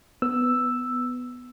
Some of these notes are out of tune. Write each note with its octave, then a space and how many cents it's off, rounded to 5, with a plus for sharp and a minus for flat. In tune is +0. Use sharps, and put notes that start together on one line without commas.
B3 +10 E6 +0